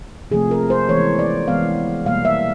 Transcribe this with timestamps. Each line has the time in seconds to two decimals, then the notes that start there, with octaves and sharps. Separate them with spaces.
0.31 C3 F3 A3 G#4
0.51 A#4
0.70 C5
0.89 E3 G#3 B3 C#5
1.19 D5
1.48 E3 G#3 B3 F5
2.05 B2 G3 A#3 F5
2.25 E5